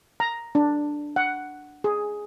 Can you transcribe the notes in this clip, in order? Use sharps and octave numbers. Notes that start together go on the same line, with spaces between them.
A#5
D4
F#5
G#4